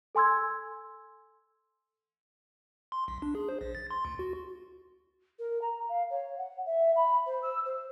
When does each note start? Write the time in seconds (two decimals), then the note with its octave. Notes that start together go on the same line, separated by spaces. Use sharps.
0.15 A4 G#5 C6 E6 G#6
2.92 C6
3.08 B1
3.22 D4
3.35 G#4
3.49 C5
3.61 A#1
3.75 A6
3.91 C6
4.05 D2
4.19 F#4
5.39 A#4
5.62 A#5
5.89 F5
6.10 C#5
6.38 F#5
6.66 E5
6.96 B5
7.26 C5
7.43 E6
7.65 C5